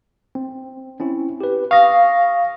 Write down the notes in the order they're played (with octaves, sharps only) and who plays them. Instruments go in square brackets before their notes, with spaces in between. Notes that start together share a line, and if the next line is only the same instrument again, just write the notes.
[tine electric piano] C4
C4 C#4 E4
G4 B4
[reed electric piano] F5 [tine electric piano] C#6 D#6 A#6